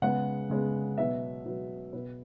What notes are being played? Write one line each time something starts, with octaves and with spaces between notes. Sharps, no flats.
C#3 G#3 B3 F#5
C#3 G#3 B3
B2 F#3 B3 E5
B2 F#3 B3
B2 B3 B4